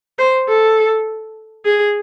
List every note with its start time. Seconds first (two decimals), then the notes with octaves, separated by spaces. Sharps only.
0.19 C5
0.48 A4
1.65 G#4